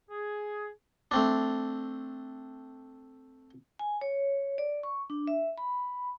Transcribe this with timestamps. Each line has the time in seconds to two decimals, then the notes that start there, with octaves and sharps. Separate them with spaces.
0.11 G#4
1.11 A3 C4 D4
3.79 G#5
4.01 C#5
4.58 D5
4.83 C#6
5.10 D4
5.27 E5
5.58 B5